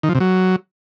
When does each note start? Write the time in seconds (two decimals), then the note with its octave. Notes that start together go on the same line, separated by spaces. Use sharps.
0.03 D#3
0.09 F3
0.15 C3
0.20 F#3